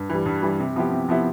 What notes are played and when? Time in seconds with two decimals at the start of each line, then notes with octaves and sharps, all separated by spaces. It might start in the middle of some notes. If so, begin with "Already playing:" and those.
Already playing: G2
0.10 E3 G3
0.26 G2
0.42 E3 G3
0.59 C3
0.76 F3 B3 E4 G4
0.93 C3
1.09 F3 B3 E4 G4